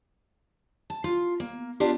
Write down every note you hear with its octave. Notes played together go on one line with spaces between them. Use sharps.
A5
F4
A#3
B3 D4 F4 G4